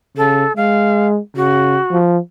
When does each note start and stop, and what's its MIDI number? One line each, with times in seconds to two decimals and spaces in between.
0.17 0.45 49
0.17 0.53 69
0.56 1.19 56
0.56 1.07 77
1.36 1.79 49
1.36 1.97 66
1.91 2.18 53